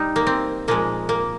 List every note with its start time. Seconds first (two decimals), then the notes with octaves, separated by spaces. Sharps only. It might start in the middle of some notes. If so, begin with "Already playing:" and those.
Already playing: G3 D#4
0.16 A#3
0.27 C4
0.68 A#2 F3 G#3 A#3
1.09 A#3